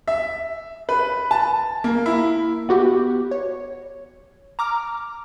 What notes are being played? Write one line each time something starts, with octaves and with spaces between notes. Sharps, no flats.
E5
B4
A5
A#3
E4
B3 F#4 G4
C#5
A#5 D6 F6